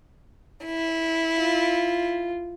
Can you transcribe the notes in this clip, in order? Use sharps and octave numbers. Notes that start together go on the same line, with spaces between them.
E4
F4